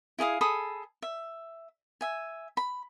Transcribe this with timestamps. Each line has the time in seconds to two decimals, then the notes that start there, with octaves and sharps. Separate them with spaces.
0.19 E4 G#4 F5 D#6
0.41 G#4 A4 B5 D#6
1.02 E5
2.01 E5 G#5
2.57 B5